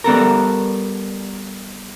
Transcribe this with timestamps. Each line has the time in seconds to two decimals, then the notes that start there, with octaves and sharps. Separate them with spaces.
0.04 G3 B3 A4 A#4